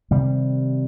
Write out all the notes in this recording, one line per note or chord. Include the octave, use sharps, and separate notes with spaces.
C3 D#3 G3